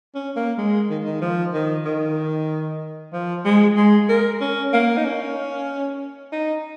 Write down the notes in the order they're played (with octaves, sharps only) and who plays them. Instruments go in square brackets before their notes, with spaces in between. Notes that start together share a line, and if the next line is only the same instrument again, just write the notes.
[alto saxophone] C#4
A#3
G#3
D#3
D#3
F3
D#3
D#3
F3
G#3
G#3
A#4
C#4
A#3
D#4
C#4
D#4